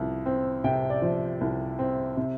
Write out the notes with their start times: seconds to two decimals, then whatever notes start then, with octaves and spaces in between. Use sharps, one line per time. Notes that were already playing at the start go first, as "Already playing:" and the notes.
Already playing: C2 F3
0.26 C4
0.64 C3 G5
0.90 D5
1.02 F3
1.41 C2
1.79 C4
2.17 C3